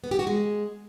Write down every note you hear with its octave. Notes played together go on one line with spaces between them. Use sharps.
B3
G4
F#4
G#3